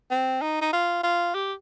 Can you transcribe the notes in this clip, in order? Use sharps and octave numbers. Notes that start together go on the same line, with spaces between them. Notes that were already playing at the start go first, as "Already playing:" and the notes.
C4
D#4
D#4
F4
F4
G4